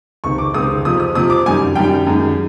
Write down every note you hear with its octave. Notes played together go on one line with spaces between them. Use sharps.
C#2 C3 D#3 C#6
D6
C#2 C3 D#3 D#6
F2 C3 F3 D#6
D#6
F2 C3 F3 D#6
D6
F#2 D#3 G3 G#5
F#2 D#3 G3 G5
F#2 D#3 G#3